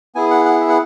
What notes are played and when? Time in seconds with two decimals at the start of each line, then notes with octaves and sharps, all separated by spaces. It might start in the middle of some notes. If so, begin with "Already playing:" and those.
0.15 B3 E4 G#4 G#5
0.31 F#5
0.45 F#5
0.61 E5
0.69 F#5